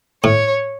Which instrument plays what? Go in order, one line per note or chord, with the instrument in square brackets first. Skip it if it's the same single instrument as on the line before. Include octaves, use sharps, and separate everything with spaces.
[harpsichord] A2 [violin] C#5